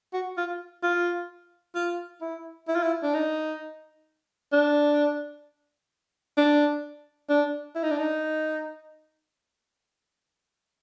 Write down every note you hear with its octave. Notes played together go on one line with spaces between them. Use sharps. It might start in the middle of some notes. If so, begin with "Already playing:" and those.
F#4
F4
F4
F4
E4
E4
F4
E4
D4
D#4
D4
D4
D4
E4
D#4
D4
D#4